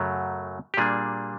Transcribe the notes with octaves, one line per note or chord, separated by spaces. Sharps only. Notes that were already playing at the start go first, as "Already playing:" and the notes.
Already playing: F#2 C#3 F#3 A3
G4
A#2 G3 A#3 D4 G#4